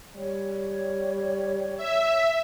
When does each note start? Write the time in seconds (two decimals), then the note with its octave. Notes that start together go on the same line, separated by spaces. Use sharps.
0.16 G3 C#5
1.77 E5